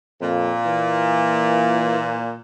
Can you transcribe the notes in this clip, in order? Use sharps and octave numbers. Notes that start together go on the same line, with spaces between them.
F2 A#2
E3